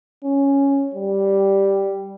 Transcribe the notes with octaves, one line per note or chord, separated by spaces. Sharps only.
C#4
G3